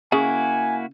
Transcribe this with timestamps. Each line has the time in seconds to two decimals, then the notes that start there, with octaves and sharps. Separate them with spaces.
0.12 C#3 A#3 E4 F#4 G#5